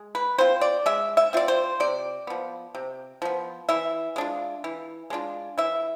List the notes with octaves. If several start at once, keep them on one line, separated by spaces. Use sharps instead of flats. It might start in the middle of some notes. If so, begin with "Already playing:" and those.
Already playing: G#3
B4
C4 F4 C5
D5
G#3 E5
E5
C4 F4 D5
C5
C3 D5
F3 B3
C3
F3 B3
E3 E5
G#3 D4 F4
E3
G#3 D4 F4
E3 E5